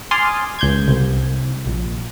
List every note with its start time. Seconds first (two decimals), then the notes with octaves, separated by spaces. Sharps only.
0.11 G#5 C6 D6 D#6 F6 A6
0.59 C#2 G6 G#6
0.88 C2
1.66 A#1